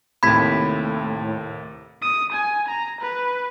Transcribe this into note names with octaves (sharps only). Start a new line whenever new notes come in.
D#2 A2 C3 B5 G#6 B6
D#6
G#5
A#5
B4